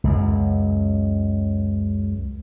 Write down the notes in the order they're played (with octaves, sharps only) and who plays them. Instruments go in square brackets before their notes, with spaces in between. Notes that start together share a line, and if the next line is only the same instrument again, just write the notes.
[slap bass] C#2 F#2